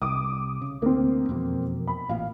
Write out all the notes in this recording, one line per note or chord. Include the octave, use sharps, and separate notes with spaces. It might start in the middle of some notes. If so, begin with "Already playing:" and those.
C2 D6 D#6
C#3
D2 A#3 C4
E1 F2 B2
B5
A1 A#2 F5